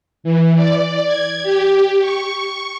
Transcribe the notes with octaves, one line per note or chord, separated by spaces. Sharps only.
E3
D5
G#6
G4
C#6